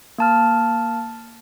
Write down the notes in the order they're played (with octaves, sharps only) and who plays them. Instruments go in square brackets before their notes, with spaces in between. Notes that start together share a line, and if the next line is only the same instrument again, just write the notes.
[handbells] A#3 A5 F6